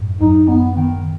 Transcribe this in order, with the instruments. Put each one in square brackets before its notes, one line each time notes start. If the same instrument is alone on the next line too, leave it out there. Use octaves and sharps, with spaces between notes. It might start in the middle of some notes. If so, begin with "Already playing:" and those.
Already playing: [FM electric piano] F#2 A2
[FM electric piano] F#2 [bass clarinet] D#4
[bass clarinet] B3
D#3